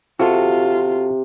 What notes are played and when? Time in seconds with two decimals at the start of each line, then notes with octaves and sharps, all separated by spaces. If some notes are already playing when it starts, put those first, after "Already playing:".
0.20 C3 F4 F#4 A4